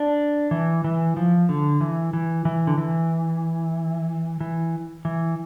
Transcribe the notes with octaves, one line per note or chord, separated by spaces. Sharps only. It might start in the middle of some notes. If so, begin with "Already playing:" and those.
Already playing: D4
E3
E3
F3
D3
E3
E3
E3
D3
E3
E3
E3